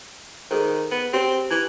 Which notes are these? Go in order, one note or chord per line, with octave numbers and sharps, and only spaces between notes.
D#3 G#4 A4 C5
B3
C4 G4 C#5
E3 A#5